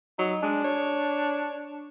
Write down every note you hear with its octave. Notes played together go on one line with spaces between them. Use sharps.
F#3 D#4
G#3 D4
C#5